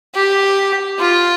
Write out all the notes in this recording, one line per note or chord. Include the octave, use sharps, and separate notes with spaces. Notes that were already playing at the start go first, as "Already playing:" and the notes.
G4
F4